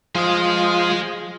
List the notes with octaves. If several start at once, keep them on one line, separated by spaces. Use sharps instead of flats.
F3 G#3 D#5